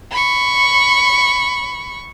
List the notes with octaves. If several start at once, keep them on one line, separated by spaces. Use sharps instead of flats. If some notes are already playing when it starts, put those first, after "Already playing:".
B5 C#6